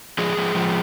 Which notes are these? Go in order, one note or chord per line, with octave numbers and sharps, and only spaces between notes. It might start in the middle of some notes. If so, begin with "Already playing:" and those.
F3 G#3 G#4
F3
F3